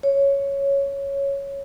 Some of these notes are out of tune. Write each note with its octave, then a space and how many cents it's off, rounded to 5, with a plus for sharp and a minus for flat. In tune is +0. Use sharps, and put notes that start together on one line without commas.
C#5 +0